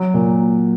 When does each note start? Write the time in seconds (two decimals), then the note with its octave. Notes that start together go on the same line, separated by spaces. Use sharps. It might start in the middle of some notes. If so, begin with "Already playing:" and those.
Already playing: F#3
0.14 A#2